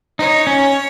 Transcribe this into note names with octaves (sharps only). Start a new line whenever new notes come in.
D#4 C#5
C#4